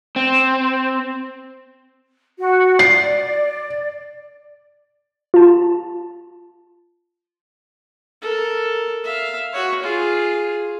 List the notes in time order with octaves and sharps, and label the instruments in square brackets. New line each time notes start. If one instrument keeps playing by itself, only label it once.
[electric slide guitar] C4
[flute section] F#4
[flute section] D5 [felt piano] C7
[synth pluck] F4 A5
[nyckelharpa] A4 A#4
E5 F5
F#4 C#5
F4 G#4